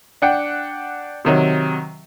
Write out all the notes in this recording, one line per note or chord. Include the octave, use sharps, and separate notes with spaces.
D4 F#5 G5
C3 D#3 F#3